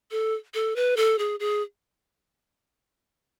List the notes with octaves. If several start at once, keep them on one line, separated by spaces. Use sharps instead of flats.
A4
A4
B4
A4
G#4
G#4